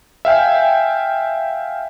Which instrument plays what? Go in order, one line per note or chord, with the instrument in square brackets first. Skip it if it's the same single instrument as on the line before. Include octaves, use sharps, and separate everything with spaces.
[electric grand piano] E5 F5 G5 G#5